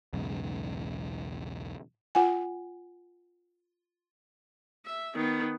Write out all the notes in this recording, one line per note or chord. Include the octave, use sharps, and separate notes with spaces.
B1 E2 G#2 C#3
F4 F#5 G#5
E5
D#3 B3